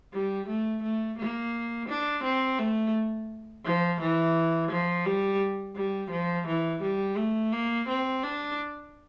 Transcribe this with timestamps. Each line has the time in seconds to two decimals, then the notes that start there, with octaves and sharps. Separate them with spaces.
0.13 G3
0.48 A3
0.83 A3
1.18 A#3
1.88 D4
2.24 C4
2.59 A3
3.64 F3
4.00 E3
4.71 F3
5.06 G3
5.75 G3
6.11 F3
6.47 E3
6.82 G3
7.17 A3
7.52 A#3
7.88 C4
8.23 D4